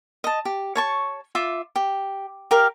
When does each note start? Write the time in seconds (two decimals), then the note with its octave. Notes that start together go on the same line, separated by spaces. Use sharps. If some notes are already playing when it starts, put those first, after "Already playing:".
0.24 D#5 A5
0.45 G4
0.75 C#5 A5 C#6
1.35 F4 E5 D6
1.76 G4
2.51 G4 A#4 F5